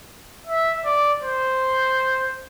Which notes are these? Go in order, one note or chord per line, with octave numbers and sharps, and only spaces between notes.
E5
D5
C5